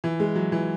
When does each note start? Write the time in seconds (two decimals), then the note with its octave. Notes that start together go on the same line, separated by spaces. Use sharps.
0.04 E3
0.20 G#3
0.36 F#3
0.52 E3